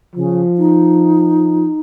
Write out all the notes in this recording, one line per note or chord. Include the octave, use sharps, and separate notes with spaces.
C#3 F3
D#4